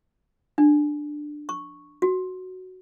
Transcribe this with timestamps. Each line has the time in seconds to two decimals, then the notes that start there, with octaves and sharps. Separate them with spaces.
0.58 D4
1.49 C#6
2.02 F#4